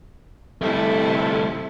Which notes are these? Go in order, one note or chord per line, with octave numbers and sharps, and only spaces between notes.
C3 G3 A3 E4 A4